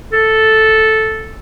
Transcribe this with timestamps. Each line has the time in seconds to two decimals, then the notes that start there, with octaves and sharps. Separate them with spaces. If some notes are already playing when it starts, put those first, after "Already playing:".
0.12 A4